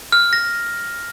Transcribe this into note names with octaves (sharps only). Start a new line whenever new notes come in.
F6
A#6